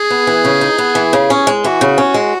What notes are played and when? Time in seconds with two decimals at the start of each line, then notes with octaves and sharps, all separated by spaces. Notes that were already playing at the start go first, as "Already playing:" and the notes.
Already playing: G#4
0.10 B3
0.27 E3
0.45 C#3
0.61 D#4
0.78 B3
0.95 E3
1.13 C#3
1.30 C#4
1.47 G#3
1.64 E3 F#4
1.81 C#3
1.98 C#4
2.14 G#3